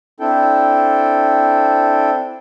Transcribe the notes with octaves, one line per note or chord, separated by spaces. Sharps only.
C4 D4 E4 A4 G5